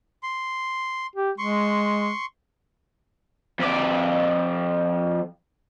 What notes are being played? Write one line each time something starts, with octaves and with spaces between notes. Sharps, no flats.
C6
G4
G#3 C6 C#6
F2 D5